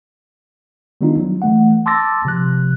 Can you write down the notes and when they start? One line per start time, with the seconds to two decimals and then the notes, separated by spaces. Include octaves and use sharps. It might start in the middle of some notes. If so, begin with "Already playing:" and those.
1.01 D#3 G3 B3 D4 D#4 F4
1.19 F#3
1.42 E3 A3 F#5
1.86 A5 C6 D6 E6 A6 A#6
2.25 C3 F3 F#6